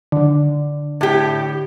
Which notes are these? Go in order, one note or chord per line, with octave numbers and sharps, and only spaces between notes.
D3
A2 G4